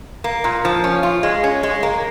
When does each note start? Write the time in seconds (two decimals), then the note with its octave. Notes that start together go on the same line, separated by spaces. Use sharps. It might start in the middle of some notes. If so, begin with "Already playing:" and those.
0.24 A#3
0.44 A#2
0.65 F3
0.84 C#4
1.03 F4
1.23 G#3
1.44 C#4
1.63 G#3
1.83 A#3